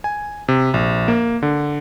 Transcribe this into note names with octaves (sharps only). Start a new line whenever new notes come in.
G#5
C3
A#1
A#3
D3